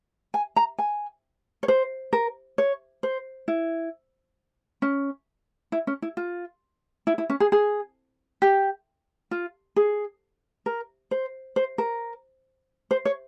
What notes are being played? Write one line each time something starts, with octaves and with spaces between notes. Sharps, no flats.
G#5
A#5
G#5
C#5
C5
A#4
C#5
C5
E4
C#4
E4
C#4
E4
F4
E4
E4
C#4
G#4
G#4
G4
F4
G#4
A#4
C5
C5
A#4
C5
C#5